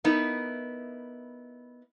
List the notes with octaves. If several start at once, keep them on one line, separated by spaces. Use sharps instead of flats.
B3 D#4 E4 A#4